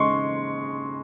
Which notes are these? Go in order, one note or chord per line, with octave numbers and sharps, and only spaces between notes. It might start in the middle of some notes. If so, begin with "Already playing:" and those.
Already playing: C#3 G#3 D#4 C6 C#6